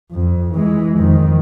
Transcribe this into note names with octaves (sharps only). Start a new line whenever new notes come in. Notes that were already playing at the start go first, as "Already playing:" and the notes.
F2
E3 G#3
F2 D#3